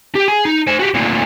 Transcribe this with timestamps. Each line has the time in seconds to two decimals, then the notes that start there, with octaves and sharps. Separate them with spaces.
0.15 G4
0.28 G#4
0.45 D#4
0.67 C5 G#5
0.79 F#4 G4
0.94 D2 A#2